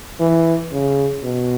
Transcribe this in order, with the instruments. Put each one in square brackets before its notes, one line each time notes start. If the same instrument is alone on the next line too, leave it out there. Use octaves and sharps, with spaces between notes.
[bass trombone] E3
C#3
B2